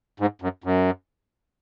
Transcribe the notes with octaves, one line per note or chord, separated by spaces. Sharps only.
G#2
F#2
F#2